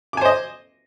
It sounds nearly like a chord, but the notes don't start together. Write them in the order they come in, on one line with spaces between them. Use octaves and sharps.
D6 G#5 C5 D#5